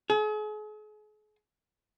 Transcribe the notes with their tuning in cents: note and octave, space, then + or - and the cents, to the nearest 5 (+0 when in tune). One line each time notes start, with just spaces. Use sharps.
G#4 +40